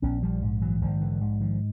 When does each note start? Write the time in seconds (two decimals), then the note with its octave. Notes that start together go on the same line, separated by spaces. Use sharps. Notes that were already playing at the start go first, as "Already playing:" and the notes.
0.02 A#1 B3 C#4
0.23 F3 G3
0.42 G#2
0.62 E3 F#3
0.81 A#1 D#3 F3
1.01 D3 E3
1.21 G#2
1.40 D#3 F3